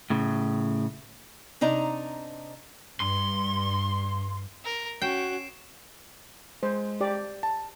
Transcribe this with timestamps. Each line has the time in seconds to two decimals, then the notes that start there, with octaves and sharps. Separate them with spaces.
0.10 A2 C#3
1.61 C3 D4 D#4 A#5
3.00 G2 C6
4.64 A#4
5.02 C#4 F#4 G5 C7 D7 E7
6.63 G#3 C5
7.01 G4 D5
7.43 A5